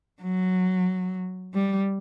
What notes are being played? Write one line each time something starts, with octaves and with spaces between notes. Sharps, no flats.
F#3
G3